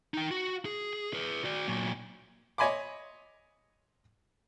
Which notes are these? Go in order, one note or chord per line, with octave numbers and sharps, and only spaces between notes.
D#4 G5
F#4
G#4
G#4 B4
F#4 D5
A#2 F#3
C#5 D#5 G#5 B5 C6 D6